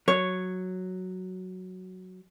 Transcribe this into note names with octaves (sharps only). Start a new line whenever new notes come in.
F#3 C#5